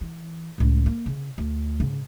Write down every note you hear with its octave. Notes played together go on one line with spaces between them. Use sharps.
E3
C#2 A2
A#3
C#3
D2
G#2 C#3